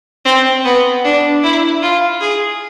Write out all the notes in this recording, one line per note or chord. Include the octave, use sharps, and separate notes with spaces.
C4
B3
D4
E4
F4
G#4